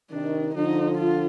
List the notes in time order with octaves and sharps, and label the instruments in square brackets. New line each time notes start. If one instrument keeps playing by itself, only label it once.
[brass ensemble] C3 D#3 [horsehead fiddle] D4
[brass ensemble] D3 F3 [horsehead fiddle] D#4
[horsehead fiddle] F4